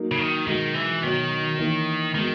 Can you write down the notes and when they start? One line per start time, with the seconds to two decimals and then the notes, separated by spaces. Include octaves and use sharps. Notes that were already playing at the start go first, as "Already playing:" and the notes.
Already playing: F#3 A#3 D#4
0.12 C#3
0.18 D#3
0.46 B2 D#3 G#3 D#4 F#4 A#4
0.74 E3
1.03 B2 D#3 F#3 B3 F#4 C#5
1.58 E3 A#3 D#4 A#4 C#5
2.15 D#3 G#3 B3 F#4